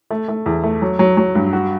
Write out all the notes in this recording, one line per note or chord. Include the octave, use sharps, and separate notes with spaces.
A3
A3
E2
A3
F#3
F#3
F#3
G2
F#4